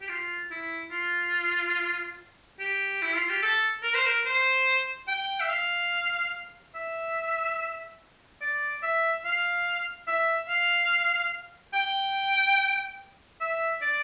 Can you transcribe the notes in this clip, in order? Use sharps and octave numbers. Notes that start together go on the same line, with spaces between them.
G4
F4
E4
F4
G4
E4
F4
G4
A4
A#4
C5
A#4
C5
G5
E5
F5
E5
D5
E5
F5
E5
F5
G5
E5
D5